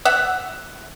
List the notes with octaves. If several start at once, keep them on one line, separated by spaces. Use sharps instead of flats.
E5 F#5